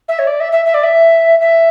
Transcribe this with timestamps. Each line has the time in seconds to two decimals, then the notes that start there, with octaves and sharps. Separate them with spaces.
0.08 E5
0.19 C#5
0.27 D5
0.40 E5
0.52 E5
0.65 E5
0.74 D5
0.84 E5
1.41 E5